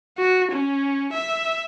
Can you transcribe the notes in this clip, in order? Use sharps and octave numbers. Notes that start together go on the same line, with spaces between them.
F#4
C#4
E5